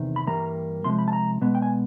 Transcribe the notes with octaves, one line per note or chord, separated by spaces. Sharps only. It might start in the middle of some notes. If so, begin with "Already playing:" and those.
Already playing: E2 C3 D#3
B5
G2 E3 G3 A#3 A#5
C3 F3 G#3 C6
B5
A5
A#5
B2 G#3 B3
G5
G#5